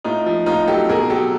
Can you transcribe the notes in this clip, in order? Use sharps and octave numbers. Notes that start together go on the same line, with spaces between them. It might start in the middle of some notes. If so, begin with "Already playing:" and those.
A2 D#4 F4
F3
A2 D#4 F4
F#3 G4 A4
B2 G#4 A#4
F#3 G4 A4